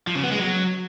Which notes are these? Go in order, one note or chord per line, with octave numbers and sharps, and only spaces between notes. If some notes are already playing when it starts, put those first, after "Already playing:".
F3
C#3
B3
G#3
F#3